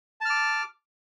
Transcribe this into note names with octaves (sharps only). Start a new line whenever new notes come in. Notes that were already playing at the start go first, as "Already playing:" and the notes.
A5 D6 F6